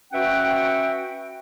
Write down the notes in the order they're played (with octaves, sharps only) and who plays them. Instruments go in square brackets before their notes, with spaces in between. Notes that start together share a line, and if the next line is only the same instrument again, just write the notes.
[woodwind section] C#4 F#4 B4 E5 F#5 G5